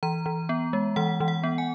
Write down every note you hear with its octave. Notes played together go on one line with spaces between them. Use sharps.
E3 A#5
E3
B3
G#3
E3 F#5
E3
F#5
B3
G#5